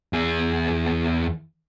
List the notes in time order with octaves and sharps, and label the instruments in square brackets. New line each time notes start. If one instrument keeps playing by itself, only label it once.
[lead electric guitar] E2 G#4